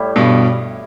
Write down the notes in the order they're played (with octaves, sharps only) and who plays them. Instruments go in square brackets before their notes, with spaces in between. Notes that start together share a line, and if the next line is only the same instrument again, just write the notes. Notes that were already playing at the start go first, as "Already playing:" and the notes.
Already playing: [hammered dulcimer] A2 G3 E4
[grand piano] G2 B2